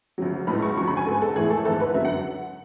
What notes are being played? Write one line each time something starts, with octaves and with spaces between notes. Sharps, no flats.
D2 C#3 F#3
B1 A2 G#3 B3 B5
C#6
D2 C#3 F#3 C#6
B5
G#5
G#2 G#3 B3 A4
A4
A1 A2 E3 A3 G#4
A4
G#1 G#2 E3 A3 A4
B4
F#2 D3 F#3 E5
F#5